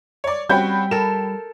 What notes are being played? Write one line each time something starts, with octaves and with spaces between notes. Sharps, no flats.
C#5 D5
G3 C4 C#4 F#4 G5 B5 G6
A4 A#4 E7